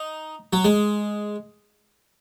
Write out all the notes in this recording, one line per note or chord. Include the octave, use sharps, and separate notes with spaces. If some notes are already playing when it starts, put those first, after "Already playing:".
Already playing: D#4
F#3
G#3